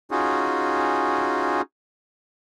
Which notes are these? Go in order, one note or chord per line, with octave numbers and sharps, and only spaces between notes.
C#4 D#4 F4 F#4 G#4